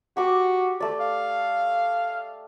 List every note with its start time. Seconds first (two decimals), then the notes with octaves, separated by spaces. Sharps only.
0.17 F#4 G4 D6
0.80 A3 D5
1.00 F5